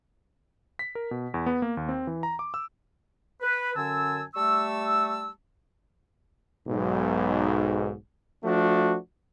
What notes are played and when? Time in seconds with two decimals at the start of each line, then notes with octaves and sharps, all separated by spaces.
0.79 B6
0.95 A#4
1.11 B2
1.34 E2
1.46 B3
1.62 A#3
1.77 D#2
1.89 C4
2.07 E3
2.23 A#5
2.39 D6
2.54 E6
3.41 B4
3.76 F#2 D3 C#4 G#5 A5 E6
4.34 G3 A3 A5 C#6 E6
6.68 B1 G#2
8.44 F3 A3 D4 F#4